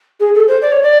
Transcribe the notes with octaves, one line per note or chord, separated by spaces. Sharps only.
G#4
A4
C5
D5
C#5
D5